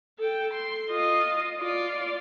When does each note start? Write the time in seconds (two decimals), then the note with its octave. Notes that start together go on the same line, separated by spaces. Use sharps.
0.19 A4 G5
0.53 C6
0.90 F4 D#5
1.61 F4 D5